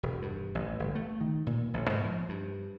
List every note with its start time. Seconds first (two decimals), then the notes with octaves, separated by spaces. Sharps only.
0.03 E1
0.22 G2
0.55 A1
0.80 G1
0.95 A3
1.21 D#3
1.47 A#2
1.74 A1
1.90 G#2
2.04 F3
2.29 G2